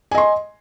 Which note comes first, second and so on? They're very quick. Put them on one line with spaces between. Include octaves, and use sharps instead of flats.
G#5 D#5 C6